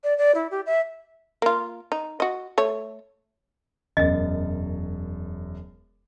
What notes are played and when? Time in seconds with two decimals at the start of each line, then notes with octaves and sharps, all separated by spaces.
0.04 D5
0.18 D5
0.35 E4
0.51 G4
0.66 E5
1.42 A#3 F4
1.92 D#4
2.20 F#4 D#5
2.58 A3 C#5
3.97 E1 F#2 D#5 A6